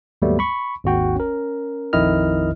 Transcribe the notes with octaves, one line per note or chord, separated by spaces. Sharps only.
D#2 G#2 F#3 G3 A3 B3
B5 C#6
G#1 D#2 F#4 G5
C#4 A#4
A#1 F2 D#3 E4 D#5 F6